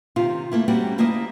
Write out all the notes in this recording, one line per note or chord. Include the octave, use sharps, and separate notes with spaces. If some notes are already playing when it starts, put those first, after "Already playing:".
C3 D#3 F4
A3 A#3 E4
G3 A#3 C4 C#4 F#4
D2 A#3 E4 D5 D#5